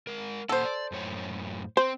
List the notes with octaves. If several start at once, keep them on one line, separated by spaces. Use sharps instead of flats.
G#3 A#4
A#2 A#3 A4 C5 F#5
D5
F#2 A2 C#5
C4 C5